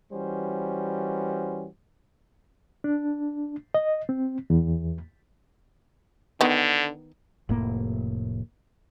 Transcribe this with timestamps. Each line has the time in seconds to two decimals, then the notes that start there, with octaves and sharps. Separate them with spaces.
0.12 E3 G3 C#4 F#4 C5
2.84 D4
3.74 D#5
4.09 C4
4.50 E2
6.41 D3 D#3 B3
7.49 F1 A2 A#3